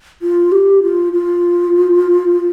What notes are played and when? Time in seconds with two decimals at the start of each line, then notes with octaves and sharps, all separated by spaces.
0.22 F4
0.52 G4
0.83 F4
1.13 F4